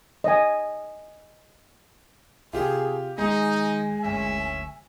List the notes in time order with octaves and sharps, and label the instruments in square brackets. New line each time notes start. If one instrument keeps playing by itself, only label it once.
[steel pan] D#5 G#5
[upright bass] C3 [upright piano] F4 G4 [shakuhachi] G#4
[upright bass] D#2 [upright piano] G#3 [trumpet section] D#4 [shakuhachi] G#5
[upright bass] F#1 D2 [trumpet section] C#4 E5